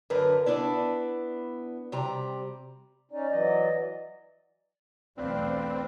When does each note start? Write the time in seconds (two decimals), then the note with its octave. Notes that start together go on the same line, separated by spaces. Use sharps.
0.10 F#2 D3 A#4 B4
0.46 B3 D4 E4 D5
1.92 C3 G3 A#5
3.11 C#4 D#4 D5
3.31 E3 F#3 D#5
5.18 B1 E2 A3 C4 D4 F4 B4 D5